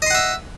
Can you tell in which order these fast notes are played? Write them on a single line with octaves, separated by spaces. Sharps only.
D#5 C6 F#5 E5